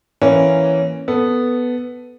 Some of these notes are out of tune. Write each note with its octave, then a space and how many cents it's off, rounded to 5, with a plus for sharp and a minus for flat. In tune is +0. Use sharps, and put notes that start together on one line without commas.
E3 +0 A#3 +0 C#4 +0
B3 +0 A4 +0